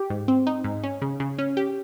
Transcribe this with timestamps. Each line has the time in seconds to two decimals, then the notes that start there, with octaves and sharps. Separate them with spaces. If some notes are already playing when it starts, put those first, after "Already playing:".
Already playing: G4
0.10 G#2
0.28 C4
0.47 D#4
0.64 G#2
0.83 C#4
1.02 C#3
1.20 C#3
1.38 C#4
1.57 G4